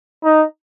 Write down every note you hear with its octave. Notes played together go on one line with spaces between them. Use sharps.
D#4